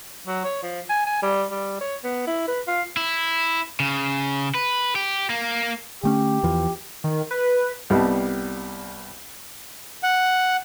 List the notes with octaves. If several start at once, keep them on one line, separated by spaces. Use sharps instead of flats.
F#3
C#5
F3
G#5
G#5
G3
G3
C#5
B3
E4
B4
F4
E4
C#3
B4
G4
A#3
D3 A3 C#4 G4
E2 E3 F3
D#3
B4
C2 G3 B3 D#5 A5
F#5